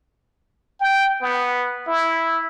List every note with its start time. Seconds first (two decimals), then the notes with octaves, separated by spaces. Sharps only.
0.80 G5
1.21 B3
1.87 E4